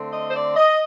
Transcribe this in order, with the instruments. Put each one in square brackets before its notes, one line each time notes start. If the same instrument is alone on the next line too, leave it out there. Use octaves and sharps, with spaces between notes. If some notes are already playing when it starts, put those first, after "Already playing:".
Already playing: [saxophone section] D3 A3 C4
D#5
C5
D5
D#5